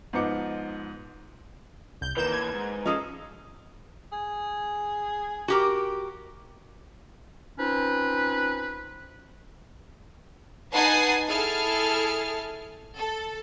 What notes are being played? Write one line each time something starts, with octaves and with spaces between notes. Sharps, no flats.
G#2 F3 B3 D#4 D6 C#7
C2 G6
D#3 E3 A#3 B4 G6 E7
G#6
G#2
F3 C#4 G#4 A4 D#5 E6
G#4
F#4 G4 A#4
C4 C#4 D#4 F4 B4
D#4 B4 F#5 G#5 A5 C7
E4 G#4 A4 A5 F6
A4